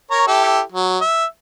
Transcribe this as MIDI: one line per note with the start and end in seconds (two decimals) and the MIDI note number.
0.11 0.27 70
0.11 0.27 73
0.11 0.27 82
0.27 0.61 64
0.27 0.61 67
0.27 0.61 69
0.72 0.98 54
1.01 1.25 76